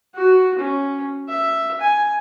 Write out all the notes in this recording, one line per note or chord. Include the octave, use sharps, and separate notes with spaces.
F#4
C#4
E5
G#5